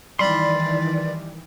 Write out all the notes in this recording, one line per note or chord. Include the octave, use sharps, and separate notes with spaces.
D#3 E3 G3 D4 D5 B5 C6